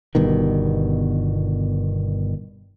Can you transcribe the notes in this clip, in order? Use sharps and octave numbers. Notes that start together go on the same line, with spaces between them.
G1 G2 B2 D#3